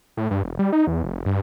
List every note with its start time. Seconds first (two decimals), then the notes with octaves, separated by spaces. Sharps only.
0.17 A2
0.31 G2
0.43 E1
0.59 G3
0.72 D#4
0.87 E2
1.03 F1
1.26 G2